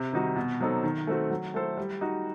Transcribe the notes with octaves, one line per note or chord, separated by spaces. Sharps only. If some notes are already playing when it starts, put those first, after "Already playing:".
Already playing: C3
D#3 G3 D#4 F#4
B2
F#3 C4 D#4 A4
D#3
A3 C4 F#4
F#3
A3 E4 A4 C5
G3
D#4 F#4